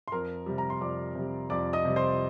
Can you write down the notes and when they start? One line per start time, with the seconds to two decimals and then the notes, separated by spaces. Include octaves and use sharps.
0.08 C6
0.12 F2 A#4 A#5
0.46 C3 G3
0.58 A#5
0.70 C6
0.81 F2 D5 D6
1.15 C3 G3
1.50 F2 D5 D6
1.73 D#5 D#6
1.85 C3 G3
1.96 C5 C6